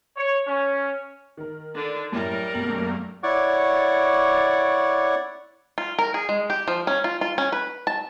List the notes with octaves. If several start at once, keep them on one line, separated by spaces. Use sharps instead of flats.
C#5
C#4
D#3 A#4
D3 D4
F#2 A2 G3 A#4
G#1 F#2 B2 A3 A#3 F#7
E4 C#5 D5 F#5 C#6 D6
F4
A#4
G#4
G#3
G4
F3
C#4
F4
F4
C#4
B4
A5